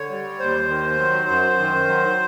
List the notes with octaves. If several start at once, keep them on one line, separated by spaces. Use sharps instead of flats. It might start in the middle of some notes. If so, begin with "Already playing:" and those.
Already playing: D3 C#5
G3
D#2 C5
D#3
F#3
F#2
D#3
F#3